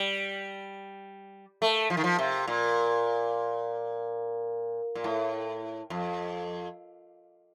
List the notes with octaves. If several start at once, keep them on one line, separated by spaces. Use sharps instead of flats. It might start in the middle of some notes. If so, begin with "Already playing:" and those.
Already playing: G3
A3
F3
D#3
F3
C3
A#2
A#2
A2
F2